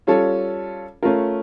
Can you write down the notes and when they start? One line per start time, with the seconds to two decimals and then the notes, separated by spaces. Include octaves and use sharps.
0.07 G3 C#4 F4 A4 C#5
1.03 A3 C#4 F4 A#4